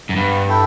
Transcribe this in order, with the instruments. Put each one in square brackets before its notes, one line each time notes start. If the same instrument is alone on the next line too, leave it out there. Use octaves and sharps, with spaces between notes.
[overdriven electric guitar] F#2
[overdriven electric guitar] G2 [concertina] B3
[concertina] E4 A4 E5 G5